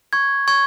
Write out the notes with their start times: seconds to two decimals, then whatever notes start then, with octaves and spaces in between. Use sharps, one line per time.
0.13 C#6 G#6
0.48 C#6 G#6